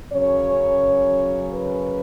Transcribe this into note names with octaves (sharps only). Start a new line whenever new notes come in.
F#2 C#3 F#3 C#4 C#5
B4